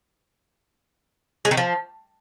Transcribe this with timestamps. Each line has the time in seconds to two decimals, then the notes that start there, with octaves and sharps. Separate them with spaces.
1.45 G#3
1.51 D#3
1.57 F3